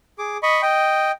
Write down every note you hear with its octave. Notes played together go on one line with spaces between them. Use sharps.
G#4 D6
D#5 B5 C#6
D#5 G5